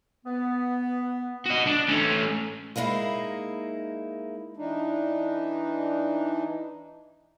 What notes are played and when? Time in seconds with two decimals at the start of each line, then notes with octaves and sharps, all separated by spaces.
0.25 B3
1.46 F#4 D#5
1.67 D4
1.89 A3 C#4
2.76 G#3 A#3 D#4 E4
4.57 E3 D4 D#4